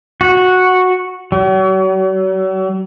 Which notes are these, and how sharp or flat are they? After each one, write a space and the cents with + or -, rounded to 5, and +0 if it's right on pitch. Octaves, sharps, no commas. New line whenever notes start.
F#4 -10
F#3 +40